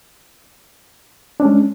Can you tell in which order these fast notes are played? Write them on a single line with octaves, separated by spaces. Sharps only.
D4 C#4 G#3